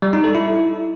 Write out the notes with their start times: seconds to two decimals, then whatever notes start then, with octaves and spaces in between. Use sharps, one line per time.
0.02 G3
0.13 D#4
0.24 A4
0.35 E4